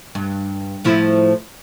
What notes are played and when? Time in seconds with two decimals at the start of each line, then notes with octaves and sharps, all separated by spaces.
0.15 G2
0.84 A2 F3 E4